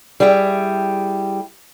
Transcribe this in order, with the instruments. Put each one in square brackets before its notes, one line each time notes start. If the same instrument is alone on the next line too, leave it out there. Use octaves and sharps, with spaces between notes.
[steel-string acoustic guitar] G3 E4 G#4 E5 G5